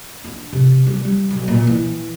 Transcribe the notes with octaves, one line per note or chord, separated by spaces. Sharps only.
D4
C3
G3
G3
B1
A#2
E3